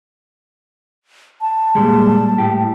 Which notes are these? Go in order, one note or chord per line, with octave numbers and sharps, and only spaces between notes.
A5
A#2 G3 G#3
A2 G4